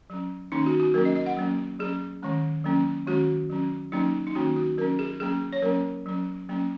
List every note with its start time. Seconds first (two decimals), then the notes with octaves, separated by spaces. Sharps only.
0.10 F#3 C#4
0.52 D#3 A#3 C#4 D#4
0.66 F#4
0.80 F#4
0.94 F#3 A#3 C#4 A#4
1.05 D#5
1.15 D#5
1.26 F#5
1.37 F#3 A#3 C#4
1.80 F#3 C#4 G#4
2.22 D#3 G#3 C#4
2.64 F#3 A#3 C#4
3.07 D#3 G#3 C#4 F#4
3.50 F#3 C#4
3.92 F#3 A#3 C#4 D#4
4.27 D#4
4.35 D#3 A#3 C#4 F#4
4.56 F#4
4.78 F#3 C#4 A#4
4.99 G#4
5.20 F#3 A#3 C#4 G#4
5.53 C#5
5.62 F#3 A#3 C#4 A#4
6.06 F#3 C#4
6.49 F#3 A#3 C#4